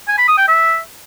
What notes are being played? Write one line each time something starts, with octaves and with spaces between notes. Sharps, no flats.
G#5
B5
D#6
G5
E5